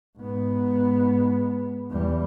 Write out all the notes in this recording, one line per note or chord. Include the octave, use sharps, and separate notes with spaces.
G#2 B3
E2 G3